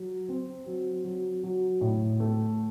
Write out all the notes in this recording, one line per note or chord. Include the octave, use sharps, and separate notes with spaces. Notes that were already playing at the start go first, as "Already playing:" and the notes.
Already playing: F#3
C4
F#3
F#3
F#3
A2
A3